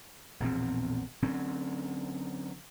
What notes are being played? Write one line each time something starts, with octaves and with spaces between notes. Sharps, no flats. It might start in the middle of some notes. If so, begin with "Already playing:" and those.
A#1 E2 B2 C4
D3 F#3 C4 C#4